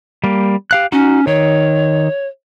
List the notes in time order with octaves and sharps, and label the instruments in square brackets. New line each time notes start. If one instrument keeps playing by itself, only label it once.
[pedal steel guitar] G3 A#3
G4 F5 F#6
[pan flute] C#4 [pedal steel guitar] D#4 F#4
[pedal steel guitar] D#3 [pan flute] C#5